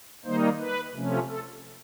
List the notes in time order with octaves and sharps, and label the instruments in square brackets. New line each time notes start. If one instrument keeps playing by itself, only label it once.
[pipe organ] D#3 G3 A#3 D#4 C5
B4
C3 F3 A3 C#4
A4